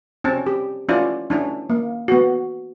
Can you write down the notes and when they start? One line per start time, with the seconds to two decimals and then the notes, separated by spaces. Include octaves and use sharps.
0.24 C4 C#4 A5
0.46 G4
0.89 C#4 E4 F4 D5
1.30 C#4 D4 E4
1.70 A#3
2.08 B3 F#4